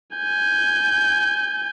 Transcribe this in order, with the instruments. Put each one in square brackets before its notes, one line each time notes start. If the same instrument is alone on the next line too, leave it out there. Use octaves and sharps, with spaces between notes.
[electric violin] G#5 G6